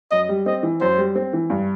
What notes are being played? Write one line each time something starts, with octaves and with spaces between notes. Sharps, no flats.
F#2 D#5
G3
C4 D#5
E3
F#2 C5
G3
C4
E3
G2